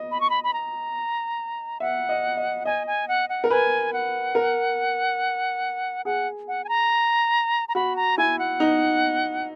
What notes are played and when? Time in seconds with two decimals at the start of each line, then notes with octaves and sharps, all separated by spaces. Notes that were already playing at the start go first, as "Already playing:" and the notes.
Already playing: D#5
0.11 B5
0.21 C#6
0.30 B5
0.44 B5
0.53 A#5
1.80 E5 F#5
2.09 D#5
2.37 D#5
2.65 D#5 G#5
2.87 G#5
3.08 F#5
3.29 F#5
3.44 A#4
3.50 B4 G#5
3.93 F#5
4.35 A#4
6.05 G#4 F#5
6.48 F#5
6.64 G#5
6.69 A#5
7.68 A#5
7.75 F#4 B5
7.96 A#5
8.18 E4 G#5
8.39 F#5
8.60 D#4